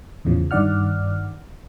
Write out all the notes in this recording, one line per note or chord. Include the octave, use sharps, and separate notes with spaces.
E2 A2 C#3 F3
G2 D#3 D5 F#5 F6